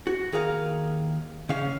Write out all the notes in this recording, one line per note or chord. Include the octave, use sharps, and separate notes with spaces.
F#4
D#2 G#4 A#4 F5
C#3 C#4 F5